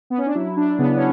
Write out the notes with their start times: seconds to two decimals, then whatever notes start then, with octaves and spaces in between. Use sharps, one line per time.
0.10 B3
0.18 C#4
0.26 D4
0.35 F#3 E4
0.57 D4
0.79 C#3 B3
0.96 C#4